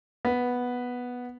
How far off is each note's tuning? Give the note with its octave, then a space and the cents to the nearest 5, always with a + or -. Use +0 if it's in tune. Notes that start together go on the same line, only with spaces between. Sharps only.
B3 -5